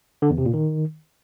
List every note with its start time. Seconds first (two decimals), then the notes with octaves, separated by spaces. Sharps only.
0.22 D3
0.30 E2
0.38 C3
0.46 A#2
0.54 D#3